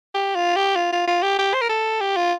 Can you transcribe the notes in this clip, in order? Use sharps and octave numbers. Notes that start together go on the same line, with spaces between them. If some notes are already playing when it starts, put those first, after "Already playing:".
G4
F4
G4
F4
F4
F4
G4
G4
C5
A#4
A4
G4
F4